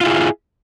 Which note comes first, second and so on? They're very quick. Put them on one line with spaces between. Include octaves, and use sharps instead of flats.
F4 E4 G#4